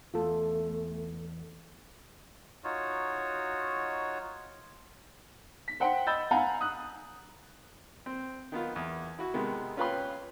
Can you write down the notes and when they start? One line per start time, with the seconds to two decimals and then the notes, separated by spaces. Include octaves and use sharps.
0.14 E2 A3 F4 A4
2.64 D#4 F4 F#4 C#5
5.68 B6
5.80 C5 F#5 G5 C6
6.07 D#5 B5 E6 G6 A6
6.31 F5 F#5 G#5 A#5 B5
6.61 D#6 F#6
8.06 C4
8.52 D#3 B3 F4
8.76 E2
9.19 E4 F#4
9.34 C3 D#3 G#3 B3
9.77 C#4 F4 B4 G5 B5 C6